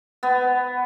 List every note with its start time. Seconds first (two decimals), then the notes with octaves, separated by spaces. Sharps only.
0.23 B3